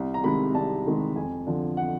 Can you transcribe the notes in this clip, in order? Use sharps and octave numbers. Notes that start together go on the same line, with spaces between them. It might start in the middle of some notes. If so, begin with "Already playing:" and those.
Already playing: C2
A#5
C3 D#3 G#3 B5
C2 A5
C3 D#3 G#3
F2 G#5
D3 F3
F#5